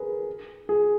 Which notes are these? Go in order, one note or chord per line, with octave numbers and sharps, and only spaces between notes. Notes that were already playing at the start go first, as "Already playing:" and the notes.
Already playing: G#4 A#4 B4
G#4